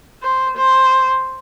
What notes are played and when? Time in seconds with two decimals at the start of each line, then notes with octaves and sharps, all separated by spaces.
0.23 C5
0.57 C5